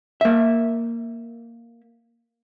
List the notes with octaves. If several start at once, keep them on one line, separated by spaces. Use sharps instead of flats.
A#3 E5